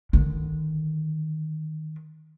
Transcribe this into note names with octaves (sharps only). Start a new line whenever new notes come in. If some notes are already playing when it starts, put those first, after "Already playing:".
D3 D#3